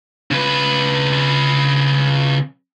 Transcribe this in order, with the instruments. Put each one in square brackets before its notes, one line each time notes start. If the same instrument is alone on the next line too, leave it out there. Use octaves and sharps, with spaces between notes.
[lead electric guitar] C#3 B4